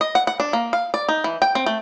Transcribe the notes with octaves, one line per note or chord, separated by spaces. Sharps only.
D#5
F#5
F#5
D4
A#3
F5
D5
D#4
E3
G5
C4
A3